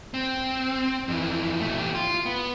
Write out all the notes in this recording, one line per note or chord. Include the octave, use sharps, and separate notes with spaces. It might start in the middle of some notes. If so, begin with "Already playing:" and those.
C4
F2 E3
B2 A3
E3 G4
F4
B3